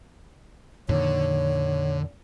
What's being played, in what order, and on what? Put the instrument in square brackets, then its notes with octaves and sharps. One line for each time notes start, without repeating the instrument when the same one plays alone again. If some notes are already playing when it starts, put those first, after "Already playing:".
[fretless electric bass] F2 A#2 D#3 [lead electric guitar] D3 [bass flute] C#5